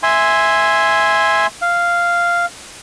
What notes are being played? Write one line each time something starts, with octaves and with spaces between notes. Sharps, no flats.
E5 G#5 C6
F5